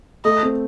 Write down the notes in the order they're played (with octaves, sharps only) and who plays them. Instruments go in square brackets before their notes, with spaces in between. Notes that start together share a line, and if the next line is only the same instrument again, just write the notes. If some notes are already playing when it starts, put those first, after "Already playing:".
[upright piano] A3 [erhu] D#5
[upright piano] C4